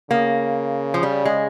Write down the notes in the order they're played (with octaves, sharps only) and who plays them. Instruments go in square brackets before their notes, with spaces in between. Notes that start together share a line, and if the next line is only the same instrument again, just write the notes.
[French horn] C#3 [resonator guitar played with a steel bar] A#3
[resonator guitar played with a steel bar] F3
G3
G#3